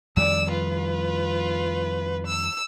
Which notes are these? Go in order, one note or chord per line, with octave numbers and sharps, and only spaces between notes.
F2 D#3 G3 D5 E6
F4 B4
E6